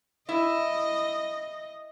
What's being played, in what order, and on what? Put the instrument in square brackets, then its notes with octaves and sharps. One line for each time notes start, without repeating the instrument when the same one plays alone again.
[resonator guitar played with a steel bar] E4 [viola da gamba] D#5